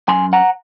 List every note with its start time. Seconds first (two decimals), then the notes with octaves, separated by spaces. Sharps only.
0.08 F#2 G#5 C6
0.33 F#5 A#5